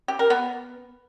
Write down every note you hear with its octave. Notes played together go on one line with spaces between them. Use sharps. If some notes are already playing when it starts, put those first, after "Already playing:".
G4
A#4
B3